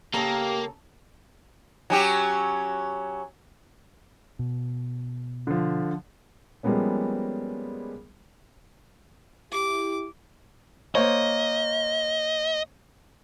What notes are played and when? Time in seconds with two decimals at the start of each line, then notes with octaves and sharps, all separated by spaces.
0.14 C#3 A#3 G4 A4 A#5
1.90 F#3 C#4 G4
4.39 B2
5.47 D3 F3
6.63 F3 G3 G#3 A#3 B3 C#4
9.52 E4 G4 D6
10.95 A#3 C5 C#5 D#5